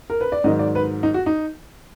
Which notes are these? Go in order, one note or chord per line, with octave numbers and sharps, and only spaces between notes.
A#4
B4
D5
G#2 D#3 F#3 D#5
D5
B4
D#4
F#4
D#4